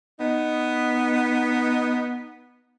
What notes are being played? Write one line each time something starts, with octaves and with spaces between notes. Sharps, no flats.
B3 D#4